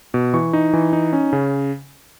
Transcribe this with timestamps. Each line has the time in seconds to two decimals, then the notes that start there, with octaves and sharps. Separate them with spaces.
0.14 B2
0.34 E3 C#6
0.53 D#4
0.73 E3
0.93 D#4
1.13 C#4
1.33 C#3